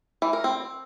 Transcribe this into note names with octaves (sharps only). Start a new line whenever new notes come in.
E3
A#4
C4